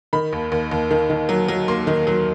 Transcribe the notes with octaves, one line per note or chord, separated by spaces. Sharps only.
D#3 B5
D#2
D#2
D#2
D#3
D#3
F#3
F#3
A#3 C6
D#3
F#3